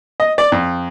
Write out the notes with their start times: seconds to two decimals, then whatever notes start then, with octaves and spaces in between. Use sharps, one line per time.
0.20 D#5
0.38 D5
0.52 F2